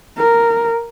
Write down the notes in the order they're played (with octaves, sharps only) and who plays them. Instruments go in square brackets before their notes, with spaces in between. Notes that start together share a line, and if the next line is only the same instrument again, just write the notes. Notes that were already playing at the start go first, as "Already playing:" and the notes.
[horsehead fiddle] A#4